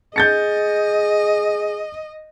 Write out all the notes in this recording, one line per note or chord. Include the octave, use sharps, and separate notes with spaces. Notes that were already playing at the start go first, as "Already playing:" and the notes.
G#4 D#5 G6 A6 C#7